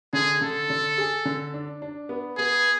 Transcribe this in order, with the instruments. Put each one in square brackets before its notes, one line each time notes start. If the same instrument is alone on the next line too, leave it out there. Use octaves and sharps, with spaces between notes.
[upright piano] D3 [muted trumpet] G#4
[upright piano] D3 [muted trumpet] A4
[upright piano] D3
G#4
D3
D4
D4
B3
[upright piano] B3 [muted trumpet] G#4